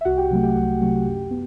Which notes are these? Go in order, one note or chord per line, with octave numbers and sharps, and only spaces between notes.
E5
C2 F#4 F#5
G4 G5
C3 F#3 A3
G4 G5
C2 G4 G5
C3 F#3 A3
F#2
B3